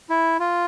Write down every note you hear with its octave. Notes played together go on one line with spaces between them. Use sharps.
E4
F4